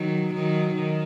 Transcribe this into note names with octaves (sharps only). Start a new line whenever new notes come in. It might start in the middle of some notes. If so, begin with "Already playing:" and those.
Already playing: D#3 F#3
D#3 F#3
D#3